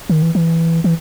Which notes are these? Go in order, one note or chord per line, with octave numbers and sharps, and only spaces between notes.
D#3
E3
E3
E3